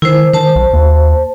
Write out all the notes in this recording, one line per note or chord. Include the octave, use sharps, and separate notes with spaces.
D#3 E4 C5
D#3 C5 A5
B1
D#2